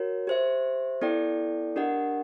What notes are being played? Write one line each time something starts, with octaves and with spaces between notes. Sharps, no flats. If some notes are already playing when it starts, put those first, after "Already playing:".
Already playing: F#4 A#4 C#5
G4 C5 E5
B3 E4 A4 D5 G5
D4 G4 A#4 D#5 F#5